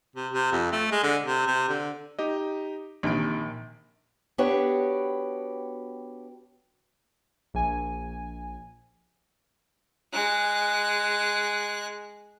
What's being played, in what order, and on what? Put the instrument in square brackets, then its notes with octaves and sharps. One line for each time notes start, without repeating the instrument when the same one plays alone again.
[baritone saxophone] C3
C3
F2
A3
G#3
D3
C3
C3
D3
[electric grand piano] D#4 G4 D#5
[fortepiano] A#1 [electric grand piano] C3 D#3 D7
[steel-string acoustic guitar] B3 D4 F#4 G4 B4 C#5
[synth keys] A#1 G#5
[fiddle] G#3 F#6